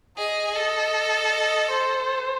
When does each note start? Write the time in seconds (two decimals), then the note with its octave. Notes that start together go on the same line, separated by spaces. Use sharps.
0.17 G#4 D#5
0.55 A4 D#5
1.33 D#5
1.71 C5